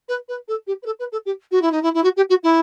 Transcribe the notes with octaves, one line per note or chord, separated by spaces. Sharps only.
B4
B4
A4
G4
B4
A4
B4
A4
G4
F#4
E4
D#4
E4
E4
F#4
G4
F#4
E4